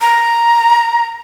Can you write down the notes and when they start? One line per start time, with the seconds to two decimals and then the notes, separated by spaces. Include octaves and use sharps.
0.01 A#5